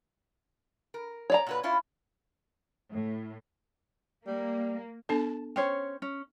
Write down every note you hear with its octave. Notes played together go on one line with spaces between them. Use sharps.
A#4
C#5 D5 A#5
A#2 F#4 B4
C#4 E4 F4
A2
G3 A#3
B3 D4 A4 A5
C#4 C5 C#5 G5
C#4